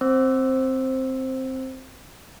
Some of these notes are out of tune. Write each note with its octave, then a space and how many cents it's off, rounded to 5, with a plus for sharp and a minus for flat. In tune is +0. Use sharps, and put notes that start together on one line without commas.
C4 +0 C5 +10 E6 +0